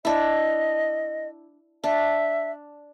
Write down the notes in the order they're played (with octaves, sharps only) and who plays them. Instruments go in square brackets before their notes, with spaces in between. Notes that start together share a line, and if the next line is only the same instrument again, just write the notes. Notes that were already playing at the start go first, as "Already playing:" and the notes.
[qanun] D4 E4 [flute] D#5
[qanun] D4 [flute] E5